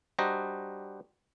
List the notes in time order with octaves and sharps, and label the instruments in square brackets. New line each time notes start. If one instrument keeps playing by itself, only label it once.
[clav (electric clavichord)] G3 D4 F#4 C5 D#5 A#5